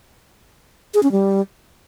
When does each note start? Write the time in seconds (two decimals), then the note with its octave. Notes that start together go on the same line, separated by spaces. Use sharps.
0.94 G#4
1.03 C#4
1.12 G3